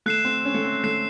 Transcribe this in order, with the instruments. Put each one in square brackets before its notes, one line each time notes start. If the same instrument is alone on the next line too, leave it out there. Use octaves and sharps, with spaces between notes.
[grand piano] A3 [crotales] F#6 C7 E7
[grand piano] C4
C#4
A3
C4
[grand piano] A3 [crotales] F#6 C7 E7